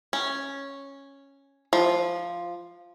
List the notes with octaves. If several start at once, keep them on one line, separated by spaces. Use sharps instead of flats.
C#4
F3